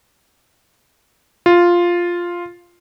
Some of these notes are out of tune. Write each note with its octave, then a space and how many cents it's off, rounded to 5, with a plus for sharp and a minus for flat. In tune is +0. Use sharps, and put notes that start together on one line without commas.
F4 +0